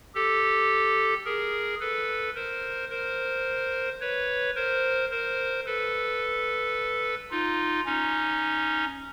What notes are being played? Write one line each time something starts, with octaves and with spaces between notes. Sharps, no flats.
G4 A4
G#4 A#4
A4 B4
A#4 C5
A#4 C5
B4 C#5
A#4 C5
A#4 C5
A4 B4
D#4 F4
C#4 D#4